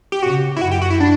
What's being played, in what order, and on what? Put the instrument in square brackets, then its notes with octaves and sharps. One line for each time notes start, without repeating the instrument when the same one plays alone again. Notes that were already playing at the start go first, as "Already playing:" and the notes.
[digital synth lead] G4
[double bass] C#3 [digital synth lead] F#4
[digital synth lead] E4
[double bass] F#2 [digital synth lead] F#4
[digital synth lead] G4
F#4
E4
D4